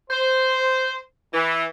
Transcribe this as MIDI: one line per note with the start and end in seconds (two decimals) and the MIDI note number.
0.11 0.97 72
1.34 1.64 52